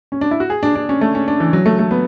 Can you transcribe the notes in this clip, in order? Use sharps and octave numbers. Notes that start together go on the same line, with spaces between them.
C#4
D4
E4
F#4
G#4
D4
D4
C#4
A3
C#4
D4
E3
F#3
A3
A3
B3